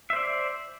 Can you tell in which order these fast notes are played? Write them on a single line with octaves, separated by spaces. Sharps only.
E5 C5 D5